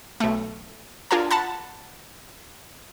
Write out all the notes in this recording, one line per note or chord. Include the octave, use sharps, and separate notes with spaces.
B1 A3
D4 F4 A#4 G#5 A5
F#5 A5 B5